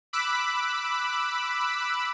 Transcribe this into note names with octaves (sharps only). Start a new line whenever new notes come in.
B5 D6 E6 F#6 B6